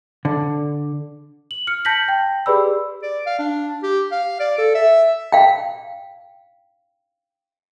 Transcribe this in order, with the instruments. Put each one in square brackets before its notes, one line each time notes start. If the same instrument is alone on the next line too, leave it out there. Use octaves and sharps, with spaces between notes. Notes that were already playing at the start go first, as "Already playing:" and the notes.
[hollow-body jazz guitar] D3
[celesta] F#7
F6 C#7
A5 G6 A#6 B6 F#7
G5
G4 G#4 B4 D5 B5 E6
[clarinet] D5
F5
D4
G4
F5
D5
A4
E5
[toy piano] F5 G5